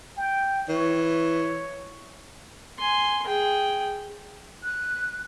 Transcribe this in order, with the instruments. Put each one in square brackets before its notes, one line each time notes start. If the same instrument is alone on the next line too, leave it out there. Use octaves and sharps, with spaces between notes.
[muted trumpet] G5
[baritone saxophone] E3 [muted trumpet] C#5
[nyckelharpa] G#5 C6
G#4 G5
[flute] F#6